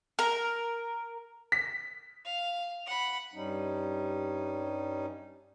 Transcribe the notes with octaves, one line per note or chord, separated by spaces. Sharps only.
A#4
B6
F5
F#5 B5
G2 G3 C#4 D#4